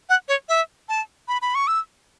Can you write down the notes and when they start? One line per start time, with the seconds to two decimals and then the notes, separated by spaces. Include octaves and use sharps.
0.09 F#5
0.28 C#5
0.49 E5
0.89 A5
1.28 B5
1.42 B5
1.55 C#6
1.67 E6